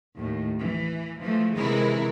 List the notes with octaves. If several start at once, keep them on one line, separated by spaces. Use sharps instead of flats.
D#2 A2
E3
E3 F3 A3
C3 D#3 E3 G#3 E4 A#4